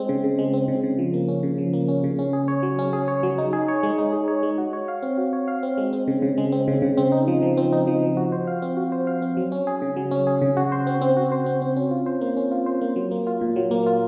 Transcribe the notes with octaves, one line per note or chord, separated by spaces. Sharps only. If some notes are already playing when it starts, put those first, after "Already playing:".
Already playing: G#3 C4
C#3
C#3
G#3
C4
C#3
C#3
F3
A#3
C#4
C#3
F3
A#3
C#4
C#3
C#4
G#4
C#5
F#3
C#4
G#4
C#5
F#3
D#4
G#4
C#5
G#3
D#4
G#4
C#5
G#3
F#4
C#5
F5
C4
F#4
C#5
F5
C4
G#3
C4
C#3
C#3
G#3
C4
C#3
C#3
C4
D#4
F3
F3
C4
D#4
F3
F3
F#4
C5
F5
C4
F#4
C5
F5
C4
F#3
C#4
G#4
C#3
F#3
C#4
G#4
C#3
F#4
C5
C4
C4
F#4
C5
C4
C4
C#4
F4
C5
A#3
C#4
F4
C5
A#3
F#3
A#3
F4
A#2
F#3
A#3
F4